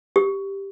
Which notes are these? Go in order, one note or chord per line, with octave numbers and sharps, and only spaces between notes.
G4